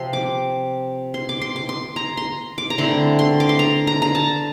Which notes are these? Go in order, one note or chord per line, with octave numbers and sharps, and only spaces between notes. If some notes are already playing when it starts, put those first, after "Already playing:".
Already playing: C3 F3 C4 C6
D6
C6
D6
C6
D6
C6
A#5
C6
D6
A#5
D3 A3 C4 E4 C6
C6
D6
C6
A#5
A#5
A#5
A5